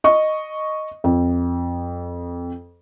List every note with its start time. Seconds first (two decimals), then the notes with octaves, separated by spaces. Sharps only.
0.04 D#5 C#6
1.04 F2